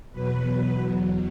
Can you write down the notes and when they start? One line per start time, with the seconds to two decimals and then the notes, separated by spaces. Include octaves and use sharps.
0.12 E2 B2 F#3 B4
0.79 E2 B2 F#3